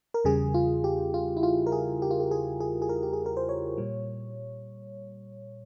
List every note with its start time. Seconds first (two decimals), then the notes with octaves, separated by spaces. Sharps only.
0.14 A#4
0.24 E2 C#3 G3 G#4
0.54 F4
0.84 G4
1.14 F4
1.37 E4
1.43 F4
1.66 A#4
1.72 G#4
2.02 G4
2.11 F4
2.20 G4
2.31 G#4
2.60 G#4
2.82 G#4
2.89 A#4
3.03 G4
3.13 G#4
3.26 A#4
3.37 C5
3.49 C#5
3.78 A#2 G3